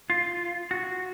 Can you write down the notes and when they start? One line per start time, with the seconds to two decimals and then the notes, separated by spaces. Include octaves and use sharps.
0.10 F4
0.71 F#4